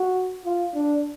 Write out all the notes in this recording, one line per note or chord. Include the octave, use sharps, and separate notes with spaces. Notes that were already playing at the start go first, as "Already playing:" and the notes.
Already playing: F#4
F4
D4